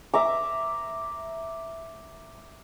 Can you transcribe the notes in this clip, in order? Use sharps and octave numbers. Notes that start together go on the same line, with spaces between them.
E5 A#5 D6